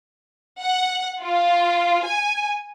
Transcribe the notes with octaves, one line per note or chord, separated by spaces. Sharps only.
F#5
F4
G#5